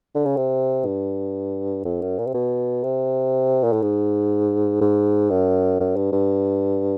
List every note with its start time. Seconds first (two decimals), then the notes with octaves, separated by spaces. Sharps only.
0.15 D3
0.26 C#3
0.37 C3
0.86 G2
1.85 F2
2.02 F#2
2.18 A#2
2.27 C3
2.34 B2
2.83 C3
3.64 A#2
3.73 A2
3.82 G#2
4.81 G#2
5.30 F#2
5.80 F#2
5.96 G2
6.12 G2